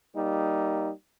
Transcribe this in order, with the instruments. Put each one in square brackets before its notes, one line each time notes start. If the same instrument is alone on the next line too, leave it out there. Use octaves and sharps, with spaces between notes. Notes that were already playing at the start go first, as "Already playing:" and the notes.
[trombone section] G3 A#3 D#4